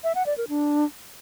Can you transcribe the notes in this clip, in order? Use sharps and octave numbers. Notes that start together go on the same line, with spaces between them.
E5
F#5
D5
A#4
D4